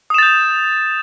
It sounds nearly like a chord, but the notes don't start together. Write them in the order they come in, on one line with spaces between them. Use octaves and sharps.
D#6 E7 A6 G6